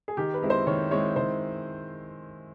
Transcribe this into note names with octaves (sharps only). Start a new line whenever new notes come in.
G#4
D#3 G4
B4
G#3 C4 E4
C5
D#3 C#5
G#3 C4 E4 C#5
D#3 C5